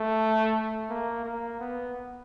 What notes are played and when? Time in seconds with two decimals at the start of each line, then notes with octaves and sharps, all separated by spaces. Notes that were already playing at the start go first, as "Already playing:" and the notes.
Already playing: A3
0.90 A#3
1.24 A#3
1.60 B3